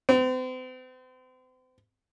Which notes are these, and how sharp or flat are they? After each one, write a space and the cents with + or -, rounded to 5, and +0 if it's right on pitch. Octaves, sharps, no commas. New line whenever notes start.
C4 -40